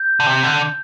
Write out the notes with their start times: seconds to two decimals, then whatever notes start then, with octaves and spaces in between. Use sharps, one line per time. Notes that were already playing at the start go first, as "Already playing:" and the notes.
Already playing: G6
0.20 D3
0.26 C3
0.43 D3